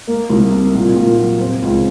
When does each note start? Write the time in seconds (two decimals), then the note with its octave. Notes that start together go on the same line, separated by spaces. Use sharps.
0.07 A#3
0.30 C2
0.51 C3
0.74 A#2
0.96 A#2
1.18 F#3
1.40 C4
1.62 C#2